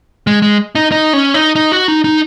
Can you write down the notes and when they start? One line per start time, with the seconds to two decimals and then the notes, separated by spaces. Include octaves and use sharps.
0.27 G#3
0.42 G#3
0.75 D#4
0.92 D#4
1.13 C#4
1.34 D#4
1.56 D#4
1.72 F#4
1.88 D#4
2.04 D#4